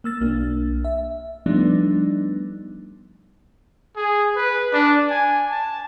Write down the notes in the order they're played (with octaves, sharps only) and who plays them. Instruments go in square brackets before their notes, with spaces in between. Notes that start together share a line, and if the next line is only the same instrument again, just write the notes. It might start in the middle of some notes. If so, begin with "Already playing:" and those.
[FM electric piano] A#3 E6 A6
B1 A#3 D4
E5
F3 G3 A3 B3 D4 D#4
[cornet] G#4
B4
D4
G#5
A5